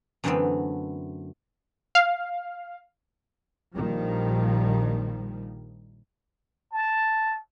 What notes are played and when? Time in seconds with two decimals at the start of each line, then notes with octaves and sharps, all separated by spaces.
0.24 F#2 D3 E3 A3 B3 C4
1.95 F5
3.75 A#1 A#2 D#3 F3 G3
6.73 A5